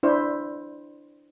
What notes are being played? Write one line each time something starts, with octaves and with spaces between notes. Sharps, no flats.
D4 E4 C5